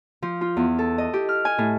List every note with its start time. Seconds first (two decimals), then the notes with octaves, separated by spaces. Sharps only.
0.22 F3
0.41 F4
0.57 E2
0.79 A4
0.98 D#5
1.13 G4
1.29 F6
1.45 G#5
1.58 A2